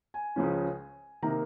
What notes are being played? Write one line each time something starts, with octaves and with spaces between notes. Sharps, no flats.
G#5
C#2 C#3 F3 G#3 C#4
C3 D#3 A#3 A#5